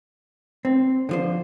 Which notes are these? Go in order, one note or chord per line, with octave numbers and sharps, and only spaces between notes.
C4
D3 F3 C5